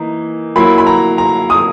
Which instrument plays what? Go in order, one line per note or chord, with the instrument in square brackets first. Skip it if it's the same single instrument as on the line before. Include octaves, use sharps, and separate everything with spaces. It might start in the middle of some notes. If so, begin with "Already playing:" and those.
Already playing: [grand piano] E3 A#3 D#4 [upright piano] A#5
[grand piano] F#3 A#3 E4 [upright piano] B5
[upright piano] B5
A#5
A#5
D#6